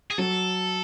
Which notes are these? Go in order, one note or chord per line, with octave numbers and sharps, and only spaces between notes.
G#4
F#3 A4